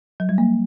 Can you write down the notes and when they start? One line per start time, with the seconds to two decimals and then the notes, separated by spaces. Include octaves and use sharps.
0.20 F#3
0.29 G3
0.38 A#3